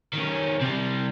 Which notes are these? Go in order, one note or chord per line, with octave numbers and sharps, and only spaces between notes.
D#3 C#4
C3 G3